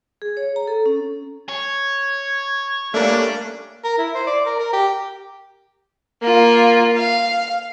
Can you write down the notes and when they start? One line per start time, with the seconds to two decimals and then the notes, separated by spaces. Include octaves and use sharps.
0.22 G#4
0.37 C#5
0.56 A#5
0.67 A4
0.86 C#4
1.49 C#5 G#6
2.94 G3 A3 A#3 C#4 D4
3.84 A#4
3.98 E4
4.15 C5
4.27 D5
4.46 A#4
4.60 A#4
4.73 G4
6.22 A#3 F4
6.96 F5